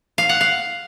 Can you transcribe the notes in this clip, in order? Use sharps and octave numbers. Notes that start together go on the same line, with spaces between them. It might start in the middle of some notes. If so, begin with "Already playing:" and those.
F5
F#5
F5